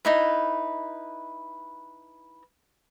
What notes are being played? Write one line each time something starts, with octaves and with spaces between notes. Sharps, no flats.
D#4 E4 B4